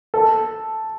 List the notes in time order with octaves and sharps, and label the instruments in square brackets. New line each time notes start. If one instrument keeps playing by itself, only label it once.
[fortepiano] A4